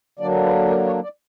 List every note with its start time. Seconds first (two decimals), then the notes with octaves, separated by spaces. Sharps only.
0.19 D3 F#3 A#3 D4 D5
0.45 B4
0.69 A#4
0.87 C#5
1.03 D5